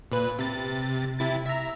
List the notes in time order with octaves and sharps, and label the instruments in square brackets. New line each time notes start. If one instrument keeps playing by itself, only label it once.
[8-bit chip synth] A#2 B4
C3 A6
C3 E4 A6
E5 A#5